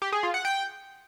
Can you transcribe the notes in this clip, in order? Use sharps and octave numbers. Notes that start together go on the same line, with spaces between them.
G4
G#4
F4
F#5
G5